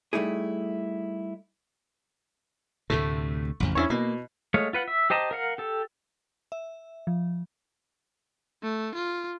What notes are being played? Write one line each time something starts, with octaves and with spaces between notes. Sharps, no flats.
G3 A3 D#4 E4 G#4
D2 A2 C3 A3
A1 F2 C#3
E2 A3 C#4 D4 E4 C#5
B2 A#3
G#3 A3 C#5 F5
F4 B4 F#5
E5
G4 C5 D#5 A5 A#5
A#4 F5 F#5
G4 A4
E5
F3
A3
F4